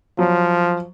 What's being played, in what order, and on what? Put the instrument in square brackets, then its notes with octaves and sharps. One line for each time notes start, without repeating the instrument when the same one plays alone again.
[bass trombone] F3 [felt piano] F#3